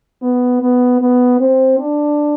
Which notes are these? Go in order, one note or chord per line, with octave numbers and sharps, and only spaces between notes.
B3
B3
B3
C4
D4